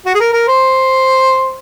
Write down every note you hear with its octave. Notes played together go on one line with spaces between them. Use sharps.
F#4
G#4
A#4
A#4
C5